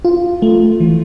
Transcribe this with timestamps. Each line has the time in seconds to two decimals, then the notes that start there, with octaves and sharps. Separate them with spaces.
0.05 F4
0.42 A3
0.80 E3